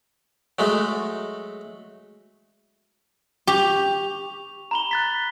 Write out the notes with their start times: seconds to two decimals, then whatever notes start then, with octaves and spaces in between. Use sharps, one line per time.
0.59 F#3 G#3 A3
3.47 G4 C#6 F7
4.71 A#5 B5 G7
4.91 F#6 A6 B6